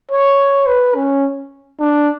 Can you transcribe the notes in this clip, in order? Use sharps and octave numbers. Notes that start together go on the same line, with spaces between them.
C#5
B4
C#4
D4